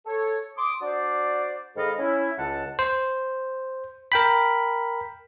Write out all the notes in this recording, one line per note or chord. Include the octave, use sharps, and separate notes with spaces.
A4 C#5
C6 D6 D#6
D4 F#4 C5 D5
G#2 D#3 A4 D#5 F5 B5
C#4 E4
C#2 F#5 A5
C5
A#4 G5 B5